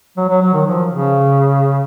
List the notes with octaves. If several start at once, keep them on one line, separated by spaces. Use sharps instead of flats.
F#3
F#3
F#3
D#3
F3
C#3